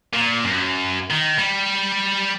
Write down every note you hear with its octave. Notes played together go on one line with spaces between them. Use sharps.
A#2
F#2
D#3
G3